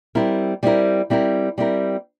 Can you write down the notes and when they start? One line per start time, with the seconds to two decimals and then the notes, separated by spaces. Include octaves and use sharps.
0.15 G3 C4 E4 A#4
0.63 G3 C4 E4 A#4
1.10 G3 C4 E4 A#4
1.58 G3 C4 E4 A#4